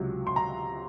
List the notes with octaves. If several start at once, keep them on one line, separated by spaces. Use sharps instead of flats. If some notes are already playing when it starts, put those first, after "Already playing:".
Already playing: C#2 C3 F#3
C6
A#5